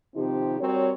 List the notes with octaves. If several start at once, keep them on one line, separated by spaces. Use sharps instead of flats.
C3 D#3 F3 C4 D#4 G4
G3 C4 F#4 A#4 C#5